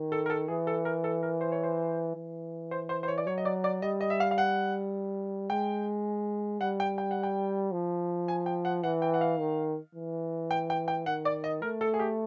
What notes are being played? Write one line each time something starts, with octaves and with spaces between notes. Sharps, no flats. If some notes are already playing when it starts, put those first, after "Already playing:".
Already playing: D#3
A4
A#4
A4
E3 G#4
A4
A#4
A4
A#4
C5
C#5
C5
E3
C5
C5
C5
C#5
D5
F#3 C#5
D#5
D5
D5
G3 D#5
D#5
E5
F5
F5
F#5
G#3 G5
G3 F#5
G5
G5
F#5
G5
F3
G#5
G5
F#5
E3 F#5
G5
F#5
F5
D#3
E3
G5
G5
G5
D#3 F#5
D5
D#5
A3 A#4
A4
G#4
G4